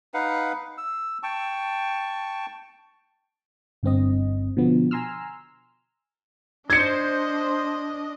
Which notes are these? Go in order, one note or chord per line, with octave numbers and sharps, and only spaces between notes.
D#4 B4 F5 F#5
E6
G5 A5 C#6
G1 G2 C4 D#5
B2 D3 F3 B3
G#5 A#5 C6 E6 F6
D4 C5 D#5 G#6 C#7